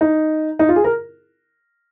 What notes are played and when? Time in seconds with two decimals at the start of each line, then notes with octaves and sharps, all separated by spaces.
0.01 D#4
0.59 D#4
0.69 F4
0.76 G#4
0.84 A#4